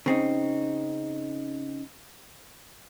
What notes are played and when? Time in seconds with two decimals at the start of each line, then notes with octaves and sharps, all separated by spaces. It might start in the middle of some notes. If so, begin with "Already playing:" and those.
0.06 C#3 C4 D#4